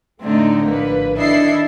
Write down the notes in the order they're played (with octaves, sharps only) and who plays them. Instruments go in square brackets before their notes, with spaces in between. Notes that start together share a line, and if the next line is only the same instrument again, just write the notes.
[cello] A2 D3 [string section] A3 D#4 [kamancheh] C4
[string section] A#1 B4 [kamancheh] A#3
[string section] D#3 E4 C7 [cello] D4 A4 [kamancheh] D#5 E5